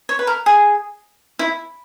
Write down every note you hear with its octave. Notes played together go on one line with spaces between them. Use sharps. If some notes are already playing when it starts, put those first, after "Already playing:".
C#5
B4
A#4
G#4
E4